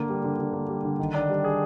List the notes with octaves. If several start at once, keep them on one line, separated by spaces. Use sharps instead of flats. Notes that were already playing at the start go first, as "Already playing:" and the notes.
Already playing: D3 A#3
G3
D3
D3
A#3
G3
D3
D#3
D4
G3
G#4